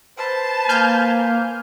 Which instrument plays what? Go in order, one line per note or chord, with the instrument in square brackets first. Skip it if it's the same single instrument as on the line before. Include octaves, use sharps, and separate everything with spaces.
[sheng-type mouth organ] B4 C5 [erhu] A5
[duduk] A#3 [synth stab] G#5 F6 G6